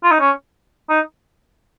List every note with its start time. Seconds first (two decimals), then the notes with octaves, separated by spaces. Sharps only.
0.04 F4
0.11 D#4
0.20 C#4
0.89 D#4